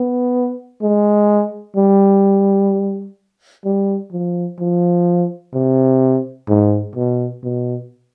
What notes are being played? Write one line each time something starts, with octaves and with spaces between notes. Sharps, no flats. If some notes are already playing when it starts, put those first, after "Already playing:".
Already playing: B3
G#3
G3
G3
F3
F3
C3
G#2
B2
B2